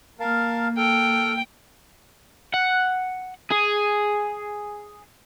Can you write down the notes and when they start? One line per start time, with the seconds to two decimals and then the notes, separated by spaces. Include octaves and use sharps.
0.20 A#3 A#4 F5 A5
0.78 A4 G5 F6
2.54 F#5
3.52 G#4